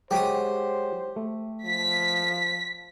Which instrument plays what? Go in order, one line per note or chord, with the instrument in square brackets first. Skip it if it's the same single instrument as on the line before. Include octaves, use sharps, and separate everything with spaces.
[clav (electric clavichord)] F#3 G#3 F#4 [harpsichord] G4 D#6 [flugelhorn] C5
[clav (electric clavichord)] A3
[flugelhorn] F3 [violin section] B6